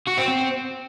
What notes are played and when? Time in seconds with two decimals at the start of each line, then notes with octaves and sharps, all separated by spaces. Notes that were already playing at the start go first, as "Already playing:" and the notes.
0.07 F#4
0.17 C4
0.28 C4